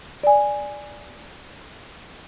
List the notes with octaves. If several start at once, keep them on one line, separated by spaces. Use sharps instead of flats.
D5 G#5